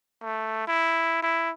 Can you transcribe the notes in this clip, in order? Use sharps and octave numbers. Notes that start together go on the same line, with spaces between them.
A3
E4
E4